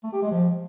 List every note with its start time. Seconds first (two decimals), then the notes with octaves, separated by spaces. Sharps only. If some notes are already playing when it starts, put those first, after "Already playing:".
0.04 A3
0.13 G4
0.22 G#3
0.31 F3